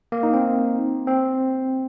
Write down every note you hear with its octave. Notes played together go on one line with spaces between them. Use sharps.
A#3
D#4
C4
C4